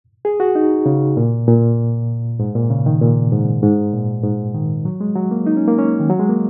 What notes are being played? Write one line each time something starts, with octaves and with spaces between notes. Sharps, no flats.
G#4
F#4
D#4
C#3
A#2
A#2
G#2
A#2
C#3
D#3
A#2
G#2
G#2
A#2
G#2
D#3
F#3
G#3
F#3
A#3
D#4
C#4
A#3
C#4
D#3
F#3
G#3
A#3